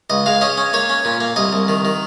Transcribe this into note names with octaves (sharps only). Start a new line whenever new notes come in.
C#2 D#5
G#3 F5
C#4 D#5
C#4
A#3 C#5
C#4
A#2
A#3
C2 D#5
C2
D#3
D#3